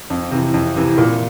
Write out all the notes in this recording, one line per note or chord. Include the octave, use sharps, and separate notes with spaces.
F2
C3 E3
F2
C3 E3
A#2